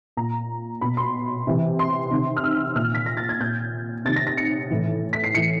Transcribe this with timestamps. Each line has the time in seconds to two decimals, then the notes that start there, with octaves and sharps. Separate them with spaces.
0.17 A#2 A#5
0.81 B2 B5
0.97 C6
1.47 C3 E3
1.79 C6
2.11 C3 D#3
2.37 F6
2.44 E6
2.75 A#2 F6
2.95 B6
3.06 A#6
3.17 A6
3.29 G#6
3.40 A#2 G6
4.05 C3 D#3 A6
4.16 A#6
4.27 A#6
4.37 C#7
4.70 A2 E3
5.13 B6
5.24 C7
5.35 A2 E3 C#7